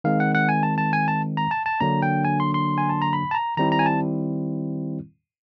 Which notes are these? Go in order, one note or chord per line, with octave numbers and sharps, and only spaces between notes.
D#3 G#3 C4 F5
F#5
F#5
G#5
A5
A5
G#5
A5
A#5
A5
A5
D3 F#3 A#3 D4 A#5
G5
G#5
C6
C6
G#5
A5
A#5
B5
A5
A#5
D#3 G3 C4 E4 A#5
A#5
G#5
A5